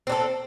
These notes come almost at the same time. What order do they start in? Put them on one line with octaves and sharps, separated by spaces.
C4 D4 A4